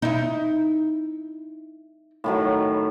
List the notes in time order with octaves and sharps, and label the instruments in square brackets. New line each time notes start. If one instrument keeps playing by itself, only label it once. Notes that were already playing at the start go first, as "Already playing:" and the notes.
[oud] D#4 E4
[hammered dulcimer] A2 D#3 F#3